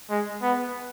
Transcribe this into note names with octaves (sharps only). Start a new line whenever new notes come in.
G#3
B3